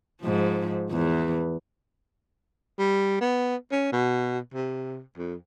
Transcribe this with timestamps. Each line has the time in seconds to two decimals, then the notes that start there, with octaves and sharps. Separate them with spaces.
0.22 G#2 F3
0.91 E2
2.78 G3
3.21 B3
3.72 C#4
3.92 B2
4.54 C3
5.17 F2